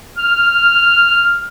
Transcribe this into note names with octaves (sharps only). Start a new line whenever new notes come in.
F6